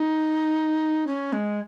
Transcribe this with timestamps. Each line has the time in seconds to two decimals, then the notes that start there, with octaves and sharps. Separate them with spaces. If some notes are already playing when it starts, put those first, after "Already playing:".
Already playing: D#4
1.07 C#4
1.33 G#3